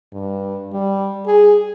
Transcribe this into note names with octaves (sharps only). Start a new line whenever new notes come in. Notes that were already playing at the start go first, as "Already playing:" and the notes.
G2
G3
G#4